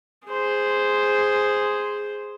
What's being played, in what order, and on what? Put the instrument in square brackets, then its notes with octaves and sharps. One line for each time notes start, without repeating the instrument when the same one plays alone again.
[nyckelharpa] G#4 C5